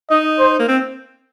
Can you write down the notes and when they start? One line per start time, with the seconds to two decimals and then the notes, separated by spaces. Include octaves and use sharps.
0.10 D#4 D#5
0.39 C5
0.59 A#3
0.68 C4